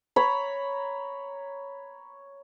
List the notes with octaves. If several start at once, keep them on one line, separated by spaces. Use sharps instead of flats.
C#5 A#5 B5